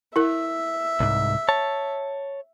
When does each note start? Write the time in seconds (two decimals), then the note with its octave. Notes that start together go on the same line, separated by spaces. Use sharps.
0.16 E4 A#4 E5
1.00 C2 G#2
1.49 C#5 A5